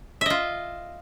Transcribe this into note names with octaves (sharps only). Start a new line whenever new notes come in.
F4 D#5 E5